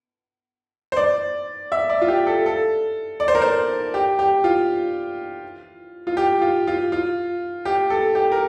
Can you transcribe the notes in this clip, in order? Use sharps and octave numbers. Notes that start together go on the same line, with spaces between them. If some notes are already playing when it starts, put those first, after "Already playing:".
C5
D5
E5
D5
F4
G4
A4
A4
D5
C5
A#4
C5
G4
G4
F4
F4
G4
F4
F4
F4
G4
A4
G4
A#4